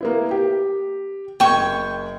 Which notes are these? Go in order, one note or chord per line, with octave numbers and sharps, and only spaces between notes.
A#3 B3 E4
G4
F#1 G5 C#6 G#6